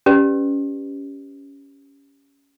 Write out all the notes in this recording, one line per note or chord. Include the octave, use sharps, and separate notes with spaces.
C#4 G4 B4 D5